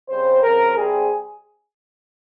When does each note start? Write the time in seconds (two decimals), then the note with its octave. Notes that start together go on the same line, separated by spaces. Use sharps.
0.10 C#3 G3 C4 C5
0.43 C#3 F3 C4 A#4
0.76 C3 G3 C4 G#4